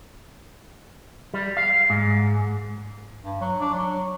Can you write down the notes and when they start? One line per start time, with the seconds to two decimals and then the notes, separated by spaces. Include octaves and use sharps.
1.34 G3
1.57 F5
1.90 G#2
3.23 G2
3.41 F#3
3.60 D4
3.74 F#3